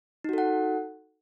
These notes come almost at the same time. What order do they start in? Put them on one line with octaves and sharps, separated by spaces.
D#4 F#4 A4 F#5